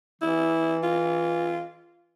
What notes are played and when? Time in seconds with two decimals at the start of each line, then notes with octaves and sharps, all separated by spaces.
0.22 E3 E4
0.83 F4